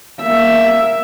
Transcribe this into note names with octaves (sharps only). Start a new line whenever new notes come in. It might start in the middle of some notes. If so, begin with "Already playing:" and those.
A#3 E5